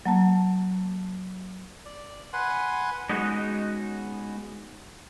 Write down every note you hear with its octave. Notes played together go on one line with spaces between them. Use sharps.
F#3 A#3 A5
D5
B4 F#5 G#5 C6
G#3 B3 C#4 D#4 F#4